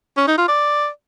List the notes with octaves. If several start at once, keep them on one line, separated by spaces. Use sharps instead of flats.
C#4
D#4
F4
D5